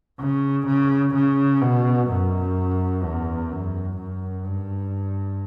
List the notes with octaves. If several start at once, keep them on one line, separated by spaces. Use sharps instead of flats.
C#3
C#3
C#3
B2
F#2
E2
F#2
F#2
G2